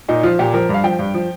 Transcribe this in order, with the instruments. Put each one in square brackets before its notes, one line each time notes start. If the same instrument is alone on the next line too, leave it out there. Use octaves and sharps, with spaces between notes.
[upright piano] A#2 D#4
F3 F4
A#2 G4
F3 A#4
G2
F5
F3 G5
G2
F3